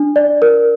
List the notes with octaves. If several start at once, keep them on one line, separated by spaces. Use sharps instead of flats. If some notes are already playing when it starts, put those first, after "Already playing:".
Already playing: D4
D5
A#4